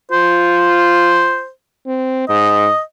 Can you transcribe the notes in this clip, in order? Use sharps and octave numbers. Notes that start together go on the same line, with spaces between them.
F4 C5
C4
G#2 D#5